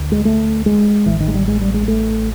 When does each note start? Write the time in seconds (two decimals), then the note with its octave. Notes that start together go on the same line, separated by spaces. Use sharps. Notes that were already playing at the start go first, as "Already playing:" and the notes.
Already playing: D2 D3
0.12 G#3
0.25 A3
0.66 G#3
1.06 A1 A2 E3
1.20 D#3
1.28 G#3
1.34 G3
1.48 G#3
1.61 G3
1.74 G#3
1.88 A3